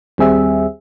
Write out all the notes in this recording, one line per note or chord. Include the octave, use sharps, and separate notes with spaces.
D#2 G3 C4 G#4 E5